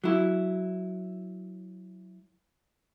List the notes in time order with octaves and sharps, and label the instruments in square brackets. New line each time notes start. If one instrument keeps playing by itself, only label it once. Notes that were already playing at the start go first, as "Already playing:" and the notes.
[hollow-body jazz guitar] F#3 E4